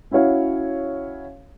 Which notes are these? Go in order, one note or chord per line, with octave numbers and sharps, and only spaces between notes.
C#4 E4 F#4 C#5 F5